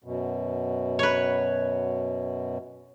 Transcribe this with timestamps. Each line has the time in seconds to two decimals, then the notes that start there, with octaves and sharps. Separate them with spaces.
0.04 F#2 B2
0.99 B4 C#5